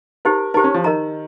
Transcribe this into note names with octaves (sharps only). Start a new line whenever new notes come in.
D#4 G4 A#4 C5
D#4 G4 A#4 C5
C#4
F3
D#3 A#4 D#5 A#5